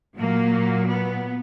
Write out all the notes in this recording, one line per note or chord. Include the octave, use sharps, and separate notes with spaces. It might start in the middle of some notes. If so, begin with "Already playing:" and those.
A#2 F#3 A#3
B3